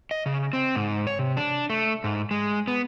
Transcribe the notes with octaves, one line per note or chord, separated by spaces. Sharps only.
D#5
C#3
C4
G#2
C#5
C3
D4
A3
G#2
G#3
B3